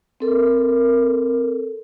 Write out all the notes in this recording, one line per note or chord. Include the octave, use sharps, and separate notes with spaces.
C4 A4 A#4